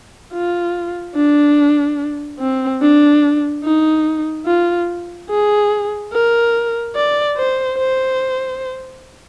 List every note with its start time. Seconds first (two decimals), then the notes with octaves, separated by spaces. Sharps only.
0.33 F4
1.16 D4
2.40 C4
2.82 D4
3.64 D#4
4.46 F4
5.30 G#4
6.13 A#4
6.96 D5
7.37 C5
7.79 C5